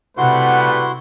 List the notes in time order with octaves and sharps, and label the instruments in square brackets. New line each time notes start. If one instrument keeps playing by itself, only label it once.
[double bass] C3 [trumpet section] G3 A3 B4 [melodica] E4 F#4 C6 [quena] F#5